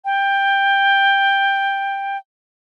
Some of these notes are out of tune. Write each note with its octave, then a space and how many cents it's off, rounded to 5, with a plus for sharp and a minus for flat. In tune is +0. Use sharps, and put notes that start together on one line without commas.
G5 +10